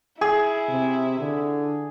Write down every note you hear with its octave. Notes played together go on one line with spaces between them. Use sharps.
E4 G#4
C3
D3